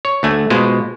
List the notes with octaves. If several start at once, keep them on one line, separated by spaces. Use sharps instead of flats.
C#5
D2 A3 G#5
B2 G#3 F4 C5